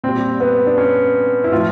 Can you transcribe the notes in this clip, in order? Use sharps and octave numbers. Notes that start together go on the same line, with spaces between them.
A#2 G3 C4
B3
D4
C#4
E4
A2 F3 F4